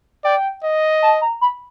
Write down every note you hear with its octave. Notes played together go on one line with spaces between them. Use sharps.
D5 G5
D#5
A5
A#5
B5